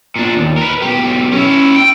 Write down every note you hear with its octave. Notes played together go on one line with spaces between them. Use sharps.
A#2 D4
D#2
A#4 B4
B1 G4
C#4 E4
G5